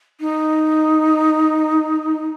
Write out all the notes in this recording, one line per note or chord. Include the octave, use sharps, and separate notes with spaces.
D#4